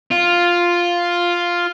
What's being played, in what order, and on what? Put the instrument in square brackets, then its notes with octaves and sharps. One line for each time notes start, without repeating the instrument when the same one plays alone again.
[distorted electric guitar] F4